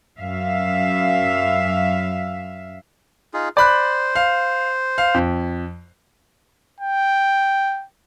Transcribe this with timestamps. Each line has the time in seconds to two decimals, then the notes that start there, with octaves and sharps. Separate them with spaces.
0.18 F#2 E5 F5
3.34 D#4 F4 G#4
3.57 C5 D5 B5 F#6
4.15 F5
4.98 F5
5.14 F2
6.81 G5